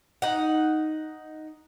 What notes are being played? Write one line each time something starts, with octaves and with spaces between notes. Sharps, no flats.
D#4 F#5